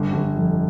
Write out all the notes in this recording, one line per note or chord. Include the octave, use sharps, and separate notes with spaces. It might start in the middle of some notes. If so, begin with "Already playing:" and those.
Already playing: G1
G1
F2